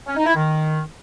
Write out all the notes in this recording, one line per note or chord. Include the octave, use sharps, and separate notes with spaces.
C#4
D#4
E4
D#3